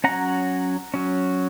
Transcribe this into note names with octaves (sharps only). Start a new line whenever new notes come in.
F#3 C#4 F#5 A#5
F#3 C#4